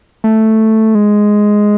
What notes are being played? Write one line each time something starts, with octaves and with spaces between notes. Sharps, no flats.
A3
G#3